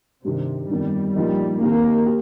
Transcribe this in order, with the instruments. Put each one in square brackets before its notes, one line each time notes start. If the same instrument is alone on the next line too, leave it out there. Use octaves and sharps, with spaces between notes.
[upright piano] G2 D#3 G3 [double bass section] C3
[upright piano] G1 F2 D#3 [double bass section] G3
[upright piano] A#2 F3 D#4 A#4 [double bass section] G3
[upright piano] D#2 D#3 C4 G4 [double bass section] A#3
[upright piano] G4